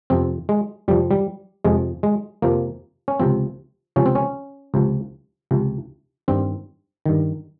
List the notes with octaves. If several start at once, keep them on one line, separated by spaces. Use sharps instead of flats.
F2 C3 F3 C4
G#3
F2 C3 F3 G3
G3
F2 C3 F3 G#3
G#3
F2 C3 F3 A#3
C#4
C#2 C3 F3 C4
C#2 C3 F3 C#4
C4
C#4
C#2 C3 F3
C#2 C3 F3
G2 D#3 C4
G2 D#3